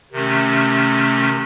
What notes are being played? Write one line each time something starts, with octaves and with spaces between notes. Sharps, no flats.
C3 D#3 A3 C#4